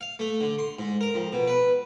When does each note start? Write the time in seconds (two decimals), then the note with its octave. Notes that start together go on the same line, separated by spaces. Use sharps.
0.01 F5
0.19 A3
0.41 D3
0.59 C6
0.79 G#2
1.01 A#4
1.14 F2
1.33 B2
1.48 B4